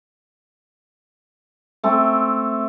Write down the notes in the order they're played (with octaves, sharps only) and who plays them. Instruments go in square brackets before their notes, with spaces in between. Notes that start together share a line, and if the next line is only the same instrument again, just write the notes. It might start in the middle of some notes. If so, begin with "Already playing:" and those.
[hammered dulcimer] A3 C4